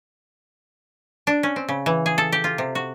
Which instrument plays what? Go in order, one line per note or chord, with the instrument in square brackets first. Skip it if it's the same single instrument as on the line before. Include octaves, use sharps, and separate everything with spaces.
[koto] D4
C#4
C4
C#3
E3
G#4
A4
G4
F4
C3
F#4